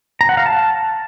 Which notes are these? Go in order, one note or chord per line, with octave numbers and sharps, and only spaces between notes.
A#5
F#5
F5
A5